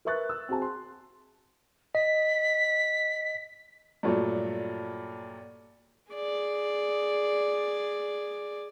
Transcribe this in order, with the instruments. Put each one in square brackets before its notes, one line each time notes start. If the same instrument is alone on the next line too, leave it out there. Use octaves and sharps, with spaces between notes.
[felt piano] A#4 B4 E5 C#6 F#6 A6
E6
C4 F#4 G#4 G#5 A5
C6
[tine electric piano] D#5 [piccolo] B6
[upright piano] G2 A#2 F#3 A3
[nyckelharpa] G#4 D5